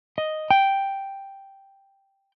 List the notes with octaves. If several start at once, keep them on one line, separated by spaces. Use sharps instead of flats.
D#5
G5